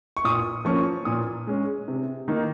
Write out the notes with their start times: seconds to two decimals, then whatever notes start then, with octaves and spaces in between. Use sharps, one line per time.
0.17 C#6
0.24 A#2 D#6
0.65 F3 A#3 C#4 C#6
1.05 A#2 D#6
1.47 G#3 C#4
1.88 C3
2.28 D#3 A#3 D#4